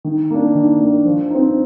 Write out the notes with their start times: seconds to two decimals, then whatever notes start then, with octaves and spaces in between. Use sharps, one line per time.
0.04 D#3
0.30 A#3 D4
0.55 D#3
0.81 A#3 D4
1.05 F3
1.30 C4 D#4